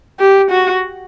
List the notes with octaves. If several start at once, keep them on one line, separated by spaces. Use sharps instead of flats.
G4
F#4